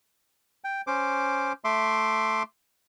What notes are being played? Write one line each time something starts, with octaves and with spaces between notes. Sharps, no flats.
G5
C#4 C5 D6
A3 E5 C6 D6